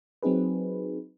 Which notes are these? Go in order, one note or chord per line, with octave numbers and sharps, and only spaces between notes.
F#3 C4 D#4 G#4 B4